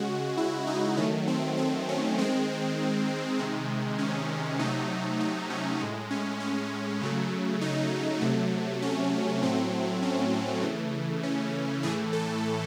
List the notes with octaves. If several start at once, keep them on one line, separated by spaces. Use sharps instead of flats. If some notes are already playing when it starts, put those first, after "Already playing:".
Already playing: C#3 G#3 F#4
E4
D#4
D#3 F#3 A3 C#4
C4
C4
C#4
D#3 G#3 C4
C3 D#3 G#3
C#4
C3 F#3 A3 D#4
D#4
C#4
A2 G#3
C#4
C#4
C#3 F#3 A3
D#4
C3 F#3 A3
C#4
A2 F#3 A3 C4
C#4
C#3 E3 A3
C#4
A2 E3 A3 G#4
A4